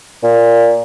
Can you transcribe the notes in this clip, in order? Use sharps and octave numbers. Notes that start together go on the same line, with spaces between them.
A#2